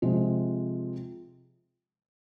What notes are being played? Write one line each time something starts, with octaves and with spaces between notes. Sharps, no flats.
C3 F3 G#3